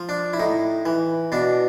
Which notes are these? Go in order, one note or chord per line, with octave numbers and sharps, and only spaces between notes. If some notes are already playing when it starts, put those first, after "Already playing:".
Already playing: F3
D4
E4
A2 D#4
E3
B2 D4